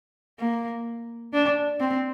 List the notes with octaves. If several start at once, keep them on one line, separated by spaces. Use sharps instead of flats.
A#3
D4
C4